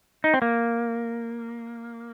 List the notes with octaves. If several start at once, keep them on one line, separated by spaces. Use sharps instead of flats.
D#4
C4
A#3